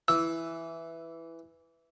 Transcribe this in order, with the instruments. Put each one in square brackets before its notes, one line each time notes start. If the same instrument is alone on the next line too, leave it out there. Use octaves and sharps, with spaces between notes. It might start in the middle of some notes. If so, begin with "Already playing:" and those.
[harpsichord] E3 [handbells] E6